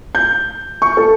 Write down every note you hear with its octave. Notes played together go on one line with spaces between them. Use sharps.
G6
C#6
A4